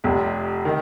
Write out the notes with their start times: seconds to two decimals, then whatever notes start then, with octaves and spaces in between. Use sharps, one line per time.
0.04 F1 F2 C3
0.65 D#3